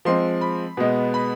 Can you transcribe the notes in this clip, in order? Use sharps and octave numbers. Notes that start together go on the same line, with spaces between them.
F3 G#3 C4 C6
B5
B2 G#3 B3
B5